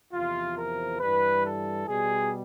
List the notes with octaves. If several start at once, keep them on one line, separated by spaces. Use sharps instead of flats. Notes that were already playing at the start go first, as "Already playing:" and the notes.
E2 C3 F3 F4
A#4
G2 E3 G3 B4
A4
B2 G3 G#4